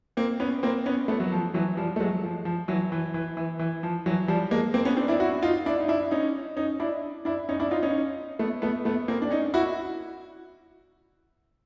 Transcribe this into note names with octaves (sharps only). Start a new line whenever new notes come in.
A#3 C4
B3 C#4
A#3 C4
B3 C#4
A3 B3
F#3
F3
E3 F#3
F3 G3
A3
F#3 G#3
F3
F3
E3 F#3
E3
E3
E3
E3
F3
E3 F#3
F3 G3
G#3 A#3
A#3 C4
B3 C#4
C4 D4
D4 E4
E4 F#4
D#4 F4
D4 E4
D#4
D4 E4
C#4 D#4
C#4 D#4
D4 E4
D4 E4
C#4 D#4
D4 E4
D#4 F4
C#4 D#4
A3 B3
A3 B3
A3 B3
A#3 C4
D4
C#4 D#4
E4 F#4